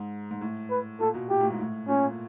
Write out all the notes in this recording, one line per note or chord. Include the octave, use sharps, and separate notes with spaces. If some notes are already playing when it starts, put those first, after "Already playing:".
Already playing: G#2
G#2
A2
B4
A#2 A4
B2
A#2 G4
A2
G#2
A2
A#2 C#4